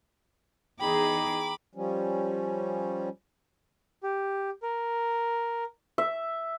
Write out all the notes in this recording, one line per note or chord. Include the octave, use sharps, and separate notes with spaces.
E2 D#4 G#4 G5 A#5 B5 D6
F3 G3 C#4
G4
A#4
E5